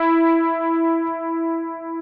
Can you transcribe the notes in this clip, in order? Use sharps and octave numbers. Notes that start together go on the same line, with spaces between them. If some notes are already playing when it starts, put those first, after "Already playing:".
Already playing: E4